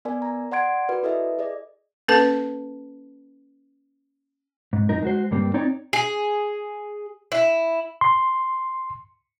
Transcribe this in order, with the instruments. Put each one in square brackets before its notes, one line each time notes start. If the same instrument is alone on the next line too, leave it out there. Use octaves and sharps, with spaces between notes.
[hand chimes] B3 A#4 D5 G#5
A#5
D5 F#5 C6 G#6 D7
F#4 A#4 B4 D5
E4 A4 B4 D#5 E5
G#4 D5 D#5
[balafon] A#3 C#4 A4 B4 A5
[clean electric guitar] G#2
F#2 D#4 A#4
G#3 F#4 C5
G2 G3 A#3 C4
C4 D#4 C#5 D5
[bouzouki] G#4
E4
[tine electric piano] C6